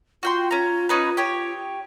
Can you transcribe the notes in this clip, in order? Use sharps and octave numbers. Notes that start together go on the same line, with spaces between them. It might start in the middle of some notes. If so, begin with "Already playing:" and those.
F4 F#4 G5 C6
C#4 A#5
C#4 D#4 B4
G4 C#5